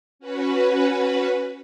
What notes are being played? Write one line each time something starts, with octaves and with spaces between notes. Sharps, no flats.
C#4 F#4 B4